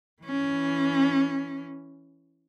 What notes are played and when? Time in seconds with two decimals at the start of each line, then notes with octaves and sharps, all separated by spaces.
0.23 E3 C#4